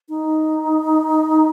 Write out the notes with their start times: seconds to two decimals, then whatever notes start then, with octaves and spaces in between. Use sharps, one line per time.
0.09 D#4